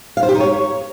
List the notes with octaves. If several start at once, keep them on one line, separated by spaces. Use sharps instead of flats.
F5
C5
G4
D#4
C#5